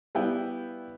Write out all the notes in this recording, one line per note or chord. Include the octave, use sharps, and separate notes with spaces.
G3 B3 E4 F5 G5